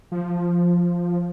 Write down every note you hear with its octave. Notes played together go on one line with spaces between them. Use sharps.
F3